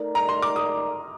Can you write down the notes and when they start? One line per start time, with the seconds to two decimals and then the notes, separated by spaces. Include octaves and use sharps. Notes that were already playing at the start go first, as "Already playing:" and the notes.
Already playing: A3 D#4 A#4 D5
0.15 A#5
0.29 C6
0.42 D6
0.56 D#6